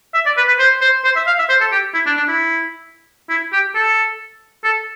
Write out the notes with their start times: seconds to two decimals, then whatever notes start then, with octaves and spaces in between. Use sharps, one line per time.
0.14 E5
0.26 D5
0.37 B4
0.48 B4
0.59 C5
0.81 C5
1.04 C5
1.16 E5
1.27 F5
1.39 E5
1.49 C5
1.61 A4
1.72 G4
1.94 E4
2.06 D4
2.17 D4
2.28 E4
3.29 E4
3.52 G4
3.75 A4
4.64 A4